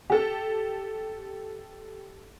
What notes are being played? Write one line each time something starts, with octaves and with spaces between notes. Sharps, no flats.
G4 A4